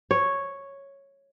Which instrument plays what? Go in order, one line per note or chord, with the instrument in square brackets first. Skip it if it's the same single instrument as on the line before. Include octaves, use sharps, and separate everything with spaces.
[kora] C#5